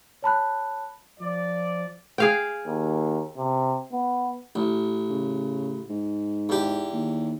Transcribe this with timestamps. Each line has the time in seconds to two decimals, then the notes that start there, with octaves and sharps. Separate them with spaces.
0.22 C#5 A5 B5 F#6
1.19 F3 D5
2.18 G#4 F5 G5
2.66 D#2
3.37 C3
3.92 B3
4.55 A1
5.10 C#3
5.89 G#2
6.49 E2 G4
6.93 D#2